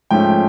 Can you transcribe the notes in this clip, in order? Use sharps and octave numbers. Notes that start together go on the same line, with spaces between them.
G#2 F3 A3 C#4 G5